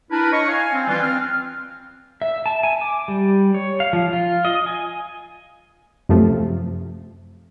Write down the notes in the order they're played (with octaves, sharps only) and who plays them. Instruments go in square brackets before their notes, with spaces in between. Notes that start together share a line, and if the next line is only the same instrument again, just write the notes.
[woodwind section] D4 E4 A#4 B4
C#5 D#5 C#6
F5 G#5
C4
E3 G3 D4 F4
C4 F6
[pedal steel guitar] E5
A5
G#5
D6
G3
C#5
F5
F3
F4
D#5
G#5
[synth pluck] F#2 C3 F3 A3